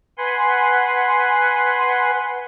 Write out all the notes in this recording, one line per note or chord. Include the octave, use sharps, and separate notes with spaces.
B4 F#5 G#5 C6